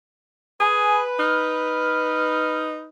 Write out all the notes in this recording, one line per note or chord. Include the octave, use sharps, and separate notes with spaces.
G#4 B4 G#5
D#4 F6